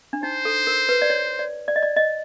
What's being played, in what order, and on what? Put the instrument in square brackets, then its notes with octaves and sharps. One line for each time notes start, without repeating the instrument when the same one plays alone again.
[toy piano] D4
[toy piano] D#4 [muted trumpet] C5
[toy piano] A4
A#4
B4
D5
C#5
D5
D5
D#5
D5
D#5